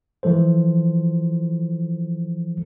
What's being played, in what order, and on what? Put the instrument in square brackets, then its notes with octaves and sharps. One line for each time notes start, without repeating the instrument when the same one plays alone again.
[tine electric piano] E3 F3 A4 C5